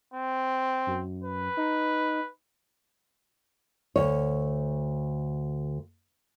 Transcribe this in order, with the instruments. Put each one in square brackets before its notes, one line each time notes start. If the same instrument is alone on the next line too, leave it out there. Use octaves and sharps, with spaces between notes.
[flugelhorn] C4
[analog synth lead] F#2
[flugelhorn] B4
[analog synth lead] D#4
[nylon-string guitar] D2 C#5